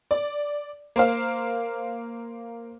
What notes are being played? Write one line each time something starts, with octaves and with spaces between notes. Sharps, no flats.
D5
A#3 C5 F5